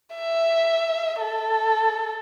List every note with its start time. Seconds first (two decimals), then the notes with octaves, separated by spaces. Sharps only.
0.15 E5
1.21 A4